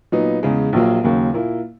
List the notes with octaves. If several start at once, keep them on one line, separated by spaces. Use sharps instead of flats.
A#2 F#3 B3 D#4
E2 C#3 G#3
A#1 A#2 F#3 A#3
D#2 C#3 F#3 A#3
A#2 A#3 E4